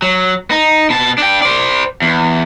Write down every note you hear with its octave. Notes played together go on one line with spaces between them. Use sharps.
F#3
D#4
B2 A5
D4 G5
C5 D5
E2